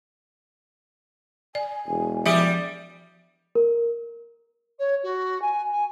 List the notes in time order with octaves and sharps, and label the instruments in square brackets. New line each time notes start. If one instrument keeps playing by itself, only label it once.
[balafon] D5 [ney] G#5
[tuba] E1
[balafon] F3 E5 [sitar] G3 D5
[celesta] A#4
[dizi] C#5
F#4
G#5
G#5